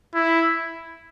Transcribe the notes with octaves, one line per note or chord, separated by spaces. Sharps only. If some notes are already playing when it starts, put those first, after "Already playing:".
E4